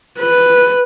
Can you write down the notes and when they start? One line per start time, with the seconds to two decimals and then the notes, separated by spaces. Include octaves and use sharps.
0.20 B4